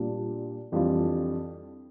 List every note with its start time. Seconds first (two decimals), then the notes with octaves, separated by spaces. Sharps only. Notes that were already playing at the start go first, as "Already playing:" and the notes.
Already playing: A#2 G3 D4 F4
0.72 F2 E3 G3 D4 F4